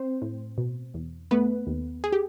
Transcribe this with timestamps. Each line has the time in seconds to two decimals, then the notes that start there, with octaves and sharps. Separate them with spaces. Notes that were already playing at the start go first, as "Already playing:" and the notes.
Already playing: C4 C5
0.22 A2
0.58 B2
0.94 E2
1.31 A3 B3 B4
1.67 D#2
2.04 G#4
2.12 G4